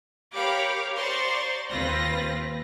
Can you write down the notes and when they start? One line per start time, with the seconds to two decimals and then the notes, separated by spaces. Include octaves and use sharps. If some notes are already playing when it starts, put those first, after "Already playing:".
0.35 G4 A#4 C#5 F5 B5 D6
0.95 C5 D5 A#5 C6 C#6
1.70 D#2 C4 F4 B4 A#6